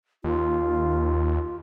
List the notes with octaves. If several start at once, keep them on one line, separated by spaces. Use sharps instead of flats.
D#2 F4